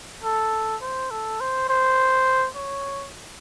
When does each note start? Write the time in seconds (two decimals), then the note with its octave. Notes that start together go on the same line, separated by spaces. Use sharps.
0.24 A4
0.82 C5
1.11 A4
1.41 C5
1.69 C5
2.55 C#5